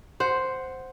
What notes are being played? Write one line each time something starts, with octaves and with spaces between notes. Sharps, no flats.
C5 F#5